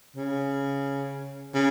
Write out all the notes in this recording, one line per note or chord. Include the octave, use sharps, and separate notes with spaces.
C#3
C#3